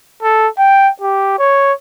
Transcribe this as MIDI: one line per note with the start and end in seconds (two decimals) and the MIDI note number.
0.23 0.47 69
0.58 0.89 79
1.01 1.38 67
1.39 1.73 73